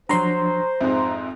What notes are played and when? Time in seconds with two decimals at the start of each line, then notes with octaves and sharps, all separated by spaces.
0.09 F3 F#3 D4 C5 A#5 C6
0.81 F2 G#2 E5